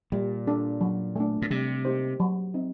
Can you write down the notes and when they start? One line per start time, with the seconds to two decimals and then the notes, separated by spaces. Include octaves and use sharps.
0.12 A#2 G3
0.47 D4 A4
0.81 F#3
1.16 A3 D4
1.42 A#2
1.50 C3 G3
1.85 A#3 D#4 G4 C5
2.20 F#3
2.54 C4 D#4